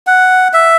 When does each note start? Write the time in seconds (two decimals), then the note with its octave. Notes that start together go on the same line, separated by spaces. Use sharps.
0.07 F#5
0.53 E5